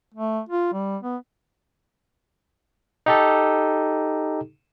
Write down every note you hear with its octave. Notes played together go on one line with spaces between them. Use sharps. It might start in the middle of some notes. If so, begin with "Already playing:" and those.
A3
F4
G3
B3
D#4 G4 A4